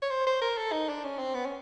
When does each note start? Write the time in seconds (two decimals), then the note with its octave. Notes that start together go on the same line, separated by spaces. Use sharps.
0.02 C#5
0.10 C5
0.27 C5
0.41 A#4
0.57 A4
0.72 D#4
0.89 D4
1.04 C#4
1.18 C4
1.35 B3
1.45 C#4